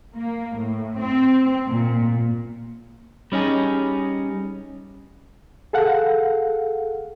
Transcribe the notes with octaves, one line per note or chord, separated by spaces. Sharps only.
A#3
A2
C4
A#2
G3 C#4 D#4 G#4
G#4 A4 F5 F#5